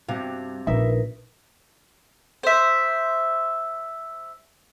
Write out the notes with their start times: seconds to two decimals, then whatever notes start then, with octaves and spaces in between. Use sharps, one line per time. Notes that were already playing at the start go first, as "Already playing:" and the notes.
0.08 G2 C3 G3 F#4 F5
0.67 A#1 D#4 A#4 B4 E5
2.43 C5 E5